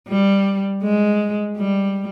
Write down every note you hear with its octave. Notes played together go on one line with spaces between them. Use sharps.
G3
G#3
G3